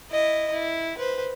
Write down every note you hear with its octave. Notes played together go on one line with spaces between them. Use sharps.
E4 D#5
E4
B4 C5